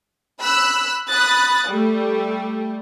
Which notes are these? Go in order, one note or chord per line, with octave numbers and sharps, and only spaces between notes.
B5 E6 F#6
B5 D#6 F#6 A6
G3 A3